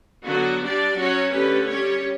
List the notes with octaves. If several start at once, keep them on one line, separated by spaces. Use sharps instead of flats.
D3 F#3 B3 F#4
G3 D4 G4 D5
F#3 C#4 F#4 C#5
D3 A3 C#4 G4 B4
G3 C#4 G4 C#5